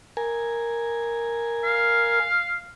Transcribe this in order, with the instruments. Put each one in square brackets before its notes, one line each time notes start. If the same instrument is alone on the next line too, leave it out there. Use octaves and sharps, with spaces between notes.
[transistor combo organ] A#4 G#5
[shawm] F5